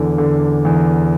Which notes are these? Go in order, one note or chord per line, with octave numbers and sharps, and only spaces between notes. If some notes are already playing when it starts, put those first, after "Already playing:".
Already playing: E2 D3
D3
E2